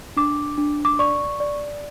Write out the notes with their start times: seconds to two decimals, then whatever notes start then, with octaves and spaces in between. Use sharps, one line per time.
0.16 D4 D6
0.58 D4
0.85 D6
0.99 D5 C#6
1.40 D5